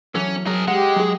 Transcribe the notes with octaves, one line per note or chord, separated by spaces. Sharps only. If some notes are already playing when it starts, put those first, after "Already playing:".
E3 F#3 C#4 A4
F#3 G#4 A#4
G#3 G4 F#5
F#3 G#4